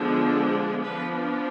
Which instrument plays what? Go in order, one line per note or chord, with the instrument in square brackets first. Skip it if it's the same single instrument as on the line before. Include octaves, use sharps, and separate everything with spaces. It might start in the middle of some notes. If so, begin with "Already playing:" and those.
Already playing: [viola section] D3 F3 G#3 B3 D4
F3 B3 D4 B4